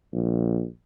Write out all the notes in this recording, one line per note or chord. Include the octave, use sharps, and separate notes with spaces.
A#1